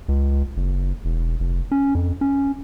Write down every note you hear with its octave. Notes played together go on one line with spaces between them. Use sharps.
C#2
F#1
E1
F1
C#4
F2
C#4